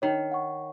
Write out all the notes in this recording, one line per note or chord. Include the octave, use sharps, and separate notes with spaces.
D#3 C#5
F#5 C#6